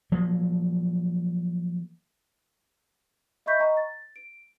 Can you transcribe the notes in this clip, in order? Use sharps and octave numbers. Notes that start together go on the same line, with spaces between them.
F3 F#3 A#3
D#5 E5 B5 C#6 G6 B6
D#5 G5 A#5 C#6
A6
D7